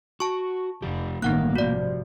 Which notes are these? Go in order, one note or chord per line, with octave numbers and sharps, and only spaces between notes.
F#4 A5 C#6
F1 F3 G4
A1 G2 D#3 A#3 B3 F#5 F#6
C3 F3 F#4 D5